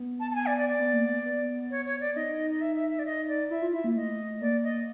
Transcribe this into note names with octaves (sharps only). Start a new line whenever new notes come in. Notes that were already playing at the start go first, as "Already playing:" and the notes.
Already playing: B3
A5
A5
G#5
D5
D5
D5
B3
A#3
B3
B3
C#5
C#5
D5
D#4 D#5
D#5
E5
E5
E5
D5
D#5
D5
E4 E5
F4
E4 E5
A#3
A3 D#5
A#3 D5
D#5